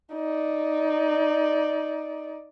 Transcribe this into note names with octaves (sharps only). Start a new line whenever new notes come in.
D#4 D5